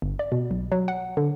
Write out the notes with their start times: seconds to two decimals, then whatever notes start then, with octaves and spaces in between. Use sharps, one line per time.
0.02 G1
0.19 D5
0.32 B2
0.51 B1
0.72 F#3
0.88 F#5
1.17 D3